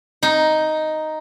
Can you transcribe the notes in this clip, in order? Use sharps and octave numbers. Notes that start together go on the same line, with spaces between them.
D#4